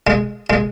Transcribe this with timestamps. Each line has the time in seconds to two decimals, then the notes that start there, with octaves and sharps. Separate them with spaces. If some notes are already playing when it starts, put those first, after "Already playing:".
0.07 G#3
0.50 G#3